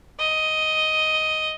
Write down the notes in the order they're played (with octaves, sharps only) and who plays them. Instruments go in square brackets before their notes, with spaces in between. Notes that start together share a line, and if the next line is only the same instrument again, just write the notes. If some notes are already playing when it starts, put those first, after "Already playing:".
[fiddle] D#5